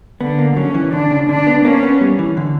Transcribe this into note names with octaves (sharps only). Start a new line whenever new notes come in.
D3 B3
A#3
F#3 C#4
E3
D3 D4
C#3
D3 D4
B3
A#3 C#4
B3
G3
E3
D3